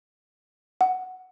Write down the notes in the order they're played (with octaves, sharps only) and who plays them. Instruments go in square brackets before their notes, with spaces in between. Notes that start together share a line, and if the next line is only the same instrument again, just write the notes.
[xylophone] F#5